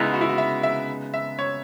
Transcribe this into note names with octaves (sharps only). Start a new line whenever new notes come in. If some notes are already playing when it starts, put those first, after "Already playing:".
Already playing: C#3 G#3 B3 D#4 E4
F#4
E4
F#4
E5
E5
E5
C#5